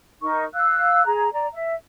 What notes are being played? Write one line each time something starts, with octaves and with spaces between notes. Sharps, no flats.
D#4 A#4 C#6
F5 E6 F#6
G#4 A#5
D5 A#5
E5